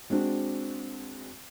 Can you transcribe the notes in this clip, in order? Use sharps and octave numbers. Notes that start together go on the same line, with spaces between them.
G#3 C4 D4 F#4